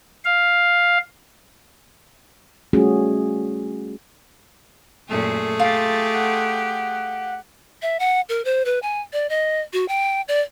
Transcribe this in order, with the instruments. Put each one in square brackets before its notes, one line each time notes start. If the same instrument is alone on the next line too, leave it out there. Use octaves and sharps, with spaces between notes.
[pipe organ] F5
[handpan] G3 A3 C#4 F4 F#4 G#4
[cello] F#2 A#2 [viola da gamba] A3 G#4
[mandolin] F4 [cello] G4 [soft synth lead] A6
[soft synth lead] F#5
[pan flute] E5
F#5
A#4
C5
B4
G#5
D5
D#5
F#4
G5
D5